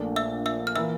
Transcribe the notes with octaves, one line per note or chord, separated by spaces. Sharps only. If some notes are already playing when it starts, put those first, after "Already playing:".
Already playing: A#1 A#2 A3 D4
E5 E6
E5 E6
F6
E3 A#3 E5 E6